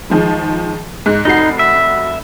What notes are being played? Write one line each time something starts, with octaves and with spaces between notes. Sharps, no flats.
D#3 F3 G#3
G#2
F1 D#4 F#4 C7
E5